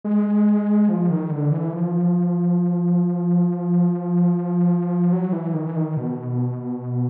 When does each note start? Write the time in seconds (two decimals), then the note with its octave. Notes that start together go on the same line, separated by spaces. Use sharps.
0.04 G#3
0.89 F3
1.10 D#3
1.31 D3
1.52 E3
1.73 F3
5.13 F#3
5.33 E3
5.54 D#3
5.66 E3
5.76 D#3
5.97 B2